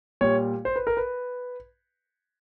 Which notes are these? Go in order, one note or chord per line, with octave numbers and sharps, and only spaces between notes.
A#2 G3 C#5
C5
B4
A#4
B4